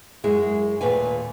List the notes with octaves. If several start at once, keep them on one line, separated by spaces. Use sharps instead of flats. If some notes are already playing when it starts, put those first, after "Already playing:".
F#2 G#3 E4 G#4
D#2 A#2 A3 B4 G#5